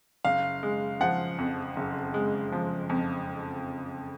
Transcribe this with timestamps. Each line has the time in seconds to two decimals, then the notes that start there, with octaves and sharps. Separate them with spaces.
0.24 F#1 F5
0.63 G#3
1.00 F3 F#5
1.38 F2
1.76 F#1
2.14 G#3
2.52 F3
2.89 F2